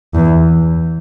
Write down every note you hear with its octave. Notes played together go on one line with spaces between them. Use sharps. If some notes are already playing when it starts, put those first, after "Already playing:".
E2